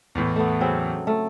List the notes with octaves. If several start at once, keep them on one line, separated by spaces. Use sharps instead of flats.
E2 A2
A3 B3
C#3 F#3 C4
A3